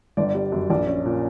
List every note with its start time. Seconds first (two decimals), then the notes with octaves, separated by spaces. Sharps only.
0.17 G1 D5
0.34 G3
0.52 F#2
0.70 A#1 D5
0.87 C#4
1.06 A#2